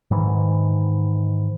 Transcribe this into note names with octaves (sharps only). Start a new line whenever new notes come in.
G#2 D#3 E3